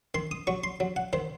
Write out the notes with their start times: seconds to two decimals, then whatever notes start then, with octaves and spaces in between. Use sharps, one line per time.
0.15 D#3 C6
0.31 D#6
0.47 F#3 C#6
0.64 C6
0.80 F#3
0.96 F#5
1.13 D#3 C5